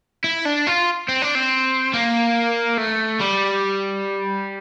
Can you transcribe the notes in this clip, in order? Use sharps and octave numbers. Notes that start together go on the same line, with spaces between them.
E4
D4
F4
C4
D4
C4
A#3
A3
G3